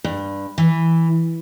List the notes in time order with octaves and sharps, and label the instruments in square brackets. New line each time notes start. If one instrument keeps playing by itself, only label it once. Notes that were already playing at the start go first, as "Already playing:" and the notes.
[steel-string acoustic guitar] G2
E3